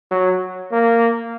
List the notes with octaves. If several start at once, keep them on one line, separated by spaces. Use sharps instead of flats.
F#3
A#3